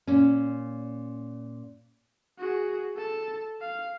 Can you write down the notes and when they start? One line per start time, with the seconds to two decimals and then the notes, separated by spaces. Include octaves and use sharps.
0.07 A#2 C#4
2.38 F#4 G#4
2.96 A4 A5
3.61 F5